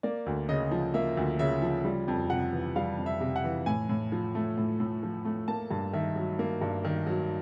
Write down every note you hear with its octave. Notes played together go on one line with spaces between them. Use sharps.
A#3 D5
D2
C#3 D#5
F3
A#3 E5
D2
C#3 E5
F3
G3
F2
C3 F#5
E3
G3 F5
F2
E5
C3
F#5
E3
A2 G#5
A2
F3
A3
A2
A2
F3
A3
A#3 A5
G2
D#3 E5
F#3
A#3
G2
D#3
F#3